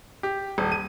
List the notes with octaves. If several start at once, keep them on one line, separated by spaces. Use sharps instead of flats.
G4
D#1
D#7